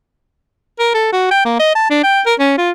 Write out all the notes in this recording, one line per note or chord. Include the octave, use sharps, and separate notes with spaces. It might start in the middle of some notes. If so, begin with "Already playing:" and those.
A#4
A4
F#4
G5
A#3
D#5
A5
D4
G5
A#4
C#4
F4